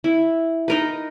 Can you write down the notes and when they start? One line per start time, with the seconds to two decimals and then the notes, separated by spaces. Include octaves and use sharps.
0.04 E4
0.68 D#4 A#4 B4